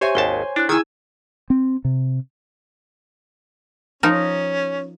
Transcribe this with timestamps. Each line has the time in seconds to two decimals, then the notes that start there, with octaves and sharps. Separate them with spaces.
0.01 G4 C5 C#5 E5 G#5
0.15 G#1 D#2 A5 G7
0.56 D4 E4 F#6
0.69 D#3 E4 G#4 G#5 E6 G#6
1.50 C4
1.85 C3
4.03 F3 C#4 D#4 A#4